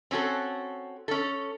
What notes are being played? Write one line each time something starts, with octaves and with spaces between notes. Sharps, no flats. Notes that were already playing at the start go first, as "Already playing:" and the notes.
C4 C#4 F#4 A4
C#4 A4